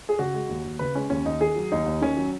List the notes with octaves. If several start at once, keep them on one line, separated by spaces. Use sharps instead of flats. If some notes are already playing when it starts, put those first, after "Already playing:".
G#4
C#3 F#4
G#3
D#2
D#2
C#3 B4
G#3 C#4
D#2 C#4
D#2 D#4
D#3 G#4
F#3
D#2 D#4
D#2
D#3 C#4
F#3